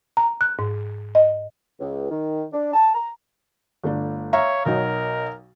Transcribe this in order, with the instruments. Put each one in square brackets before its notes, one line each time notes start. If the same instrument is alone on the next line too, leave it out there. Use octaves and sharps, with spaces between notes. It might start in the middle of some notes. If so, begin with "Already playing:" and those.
[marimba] A#5
F#6
G#2
D#5
[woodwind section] C#2
D#3
D4
A5
A#5
[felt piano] G1 A3 D4
[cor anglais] C#5 [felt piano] E5 F5 A#5
[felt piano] B1 F#3 D#4 [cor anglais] A#4